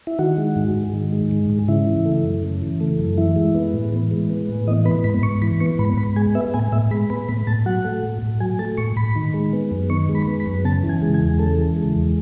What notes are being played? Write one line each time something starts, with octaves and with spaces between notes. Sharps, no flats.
E4
D#3 F#4
G#3
G#2
G#2
D#3
G#3
G#2
G#2
C#3 E4
E3
A3
F#2
C#3
E3
A3
F#2
E3 E4
G#3
B3
A2
E3
G#3
B3
A2
E3 D#5
B3 B5
G#2 B5
G#2 C#6
E3 B5
B3 C#6
G#2 B5
G#2 B5
G#3 G#5
B3 E5
A2 G#5
A2 E5
G#3 B5
B3 B5
A2 B5
A2 A5
F#3 F#5
A3
A2
A2
F#3 G#5
A3 A5
A2 C#6
A2 B5
D#3
G#3
B3
F#2
D#3 C#6
G#3
B5
B3
B5
F#2
C#3 A5
E3
G#5
G#3
G#5
E2
C#3 A4
E3
G#3
E2